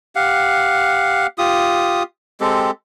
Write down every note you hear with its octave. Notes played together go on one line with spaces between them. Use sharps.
G4 F5 F#5
F4 G4 D#6
G#3 C4 G4 A4